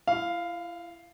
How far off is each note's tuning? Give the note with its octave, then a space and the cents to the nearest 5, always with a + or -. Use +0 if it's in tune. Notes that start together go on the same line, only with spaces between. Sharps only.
E4 +35 F5 +0